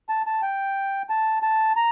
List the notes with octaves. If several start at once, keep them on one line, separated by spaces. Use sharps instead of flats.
A5
A5
G5
A5
A5
A#5